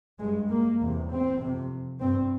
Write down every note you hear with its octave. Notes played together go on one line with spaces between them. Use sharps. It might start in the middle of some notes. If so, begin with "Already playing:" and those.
G2 G#3
A#3
E2 C3
C4
F2 C3
G2 C4